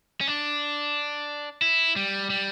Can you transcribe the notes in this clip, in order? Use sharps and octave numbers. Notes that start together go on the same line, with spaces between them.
C#4
D4
E4
G3
G3